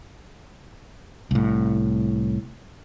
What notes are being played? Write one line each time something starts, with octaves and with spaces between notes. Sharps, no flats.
C2 A2